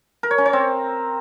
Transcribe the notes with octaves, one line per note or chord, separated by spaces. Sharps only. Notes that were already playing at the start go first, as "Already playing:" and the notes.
A#4
C#5
C#4
C#5
C4